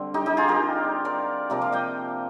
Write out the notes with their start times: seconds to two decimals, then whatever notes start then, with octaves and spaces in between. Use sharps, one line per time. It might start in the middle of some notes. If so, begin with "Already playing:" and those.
Already playing: D3 G3 C4
0.14 D#4 G4
0.26 D#4 G4
0.37 F4 G#4
0.48 G4 A#4
1.05 A#4 D5
1.50 C3 F3 A#3 A#4 D5
1.61 D5 F5
1.72 D#5 G5